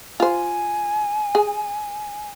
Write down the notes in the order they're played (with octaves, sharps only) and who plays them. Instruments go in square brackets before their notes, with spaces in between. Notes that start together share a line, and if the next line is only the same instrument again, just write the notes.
[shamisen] F4 C5 [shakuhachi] G#5
[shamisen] G#4